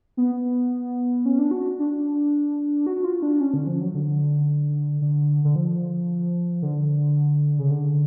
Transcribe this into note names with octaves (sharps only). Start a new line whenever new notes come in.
B3
C#4
D4
F#4
D4
F#4
F4
D4
C#4
D3
F3
F#3
D3
D3
D3
F3
D3
C#3
D3